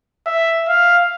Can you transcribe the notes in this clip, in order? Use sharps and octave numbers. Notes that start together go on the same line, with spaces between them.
E5
F5